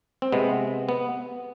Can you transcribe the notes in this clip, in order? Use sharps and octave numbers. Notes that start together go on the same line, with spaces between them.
C4
C3 G#3 B3
B3